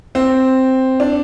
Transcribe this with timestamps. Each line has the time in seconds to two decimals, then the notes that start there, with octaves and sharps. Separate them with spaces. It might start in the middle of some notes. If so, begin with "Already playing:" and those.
0.15 C4
1.00 D4